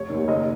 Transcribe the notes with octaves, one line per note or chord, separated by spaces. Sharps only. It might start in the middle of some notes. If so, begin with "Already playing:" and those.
Already playing: F1 C#5
D#2 D#3
F#1 D#5